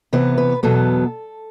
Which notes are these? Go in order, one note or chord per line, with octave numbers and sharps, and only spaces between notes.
C3 E3 B3 B4
B4
E2 B2 F#3 B3 A4